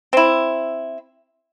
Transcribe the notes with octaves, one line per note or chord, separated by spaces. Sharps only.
C4 E4